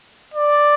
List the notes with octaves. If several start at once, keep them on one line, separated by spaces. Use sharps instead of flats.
D5